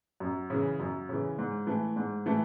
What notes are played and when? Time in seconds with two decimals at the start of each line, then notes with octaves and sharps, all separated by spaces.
0.20 F#2
0.50 C#3 E3
0.80 F#2
1.09 C#3 E3
1.38 G#2
1.67 E3 A3
1.96 G#2
2.26 E3 A3